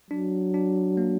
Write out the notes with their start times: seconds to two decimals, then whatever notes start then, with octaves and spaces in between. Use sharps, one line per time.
0.11 F#3 D4
0.54 D4
0.97 A#3